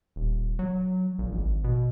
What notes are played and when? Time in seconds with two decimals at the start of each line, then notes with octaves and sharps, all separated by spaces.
0.16 D#1
0.59 F#3
1.19 A#1
1.32 G#1
1.64 B2